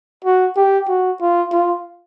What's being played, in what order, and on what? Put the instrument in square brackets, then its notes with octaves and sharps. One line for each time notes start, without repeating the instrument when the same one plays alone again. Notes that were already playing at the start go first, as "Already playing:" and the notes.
[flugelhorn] F#4
G4
F#4
F4
F4